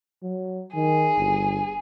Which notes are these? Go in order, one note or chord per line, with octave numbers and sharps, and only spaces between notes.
F#3
D#3 G#4
G1